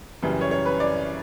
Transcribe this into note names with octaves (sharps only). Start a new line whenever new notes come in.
F#2 C#3 E3 G3
C#5
C#5
B4
D5